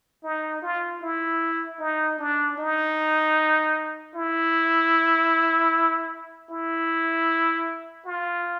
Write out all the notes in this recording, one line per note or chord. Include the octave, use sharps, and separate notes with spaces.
D#4
F4
E4
D#4
D4
D#4
E4
E4
F4